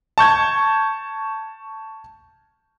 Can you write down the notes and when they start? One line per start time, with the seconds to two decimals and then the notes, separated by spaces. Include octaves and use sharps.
0.18 A5 C#6 G6 G#6